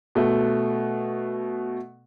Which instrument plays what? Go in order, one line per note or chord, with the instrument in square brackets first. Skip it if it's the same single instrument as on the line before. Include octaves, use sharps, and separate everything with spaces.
[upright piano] B2 A3